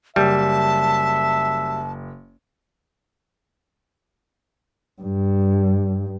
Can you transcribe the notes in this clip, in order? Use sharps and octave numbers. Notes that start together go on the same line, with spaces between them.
F#1 G3 E5 A5
G2